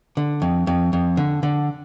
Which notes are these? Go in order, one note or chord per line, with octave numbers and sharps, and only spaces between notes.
D3
F2
F2
F2
D3
D3